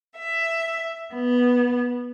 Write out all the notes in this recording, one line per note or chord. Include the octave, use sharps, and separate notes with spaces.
E5
B3